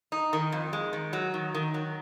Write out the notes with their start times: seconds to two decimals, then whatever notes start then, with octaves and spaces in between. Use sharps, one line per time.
0.12 D#4
0.33 D#3
0.52 F2
0.73 G#3
0.93 D#3
1.13 F#3
1.34 D#3
1.54 D#3
1.74 F#3